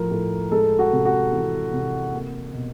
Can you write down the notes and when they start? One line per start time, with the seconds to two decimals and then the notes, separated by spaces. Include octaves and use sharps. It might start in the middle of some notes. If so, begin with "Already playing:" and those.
Already playing: A2 F3 A#4
0.11 A2
0.51 G#3 A4
0.79 F#4
0.92 C3
1.05 F#4
1.32 E3
1.73 C3
2.13 A#3
2.53 B2